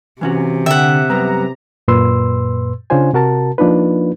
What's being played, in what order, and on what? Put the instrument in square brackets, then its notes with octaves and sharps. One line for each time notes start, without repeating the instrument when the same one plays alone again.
[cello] C3 [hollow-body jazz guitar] E3 C#4 F#4
[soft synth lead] D3 [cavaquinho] E5 F#5 [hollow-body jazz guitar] G5
[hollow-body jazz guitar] F#2 G3 B3 [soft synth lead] A#5
[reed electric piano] F#2 A#2 B4 C6 E6
C#3 C#4 D4 F4 C5 G#5
C3 F#4 A#4 A5
F3 A#3 D4 D#4 F4 B4